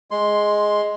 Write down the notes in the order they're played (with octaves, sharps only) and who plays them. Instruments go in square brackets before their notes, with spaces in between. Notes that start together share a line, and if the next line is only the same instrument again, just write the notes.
[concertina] G#3 C6